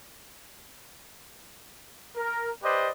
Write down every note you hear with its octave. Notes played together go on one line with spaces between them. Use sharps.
A#4
G4 B4 C5 D5 D#5